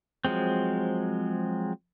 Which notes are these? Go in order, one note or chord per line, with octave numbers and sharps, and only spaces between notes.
F3 F#3 G#3 C4